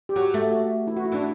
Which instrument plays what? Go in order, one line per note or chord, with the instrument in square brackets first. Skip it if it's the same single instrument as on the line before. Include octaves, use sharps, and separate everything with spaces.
[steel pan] G4
[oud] F#3 [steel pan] F#4
[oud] A3
[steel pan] F#4
E4
F#4
E4
[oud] E3 [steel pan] D4